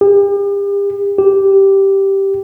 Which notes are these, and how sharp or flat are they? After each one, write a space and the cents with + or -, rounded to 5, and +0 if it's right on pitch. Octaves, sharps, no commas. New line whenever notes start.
G4 +40
G4 -5